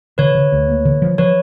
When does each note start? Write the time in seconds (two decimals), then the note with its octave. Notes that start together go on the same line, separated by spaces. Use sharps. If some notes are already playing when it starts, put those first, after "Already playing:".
0.18 D3 B4 C#5
0.35 D3
0.52 D2
0.68 A#3
0.85 D3
1.02 F3
1.18 F3 B4 C#5